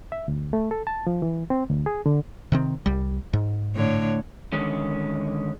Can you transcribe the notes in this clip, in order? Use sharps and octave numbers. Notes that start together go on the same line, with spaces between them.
E5
D2
A3
A4
A5
F3
E3
C4
D2
G#4
D3
C3 D#3 C4
C2 G3
G#2
A2 D3 C#5
D3 D#3 G#3 C#4